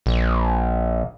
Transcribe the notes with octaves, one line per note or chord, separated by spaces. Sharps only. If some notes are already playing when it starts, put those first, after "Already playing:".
A#1